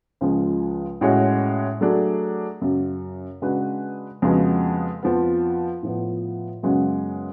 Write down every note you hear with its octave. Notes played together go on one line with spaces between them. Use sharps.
C#2 C#3 F3 G#3
A2 G#3 C#4 F#4 C#5
F#3 A3 D4 G#4
F#2 C#3 F#3
C#3 G#3 D4 F#4 B4
F2 C#3 G#3 B3 F#4
F2 F3 B3
A2 F3 B3
F#2 C#3 G#3 B3 F#4